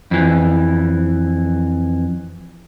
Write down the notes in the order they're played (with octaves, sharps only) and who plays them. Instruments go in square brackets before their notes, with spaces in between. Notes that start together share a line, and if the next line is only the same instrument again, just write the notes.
[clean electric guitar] F2 E3